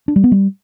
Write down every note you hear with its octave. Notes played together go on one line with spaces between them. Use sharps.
D4
G3
B3
G3